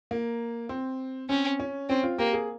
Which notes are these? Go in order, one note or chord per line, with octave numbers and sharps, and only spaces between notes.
A#3
C4
C4 C#4
C#4
C4 C#4
F4
A#3 G4
G#4